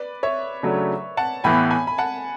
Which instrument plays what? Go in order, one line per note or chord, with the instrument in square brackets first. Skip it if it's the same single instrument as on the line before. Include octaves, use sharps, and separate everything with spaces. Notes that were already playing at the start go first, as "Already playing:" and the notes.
Already playing: [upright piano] B4 D5
C#5 E5
[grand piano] C#3 F#3 A3 D4
[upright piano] F#5 A5
[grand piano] A2 E3 B3 [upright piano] G#5 B5
[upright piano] G#5 B5
B5
F#5 A5